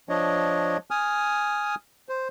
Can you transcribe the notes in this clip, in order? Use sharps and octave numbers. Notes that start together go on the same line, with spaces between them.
F3 D4 C#5 D#5
G#5 D#6 F6
C5